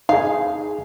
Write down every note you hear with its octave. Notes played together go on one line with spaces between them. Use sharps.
D#4 G#4 F5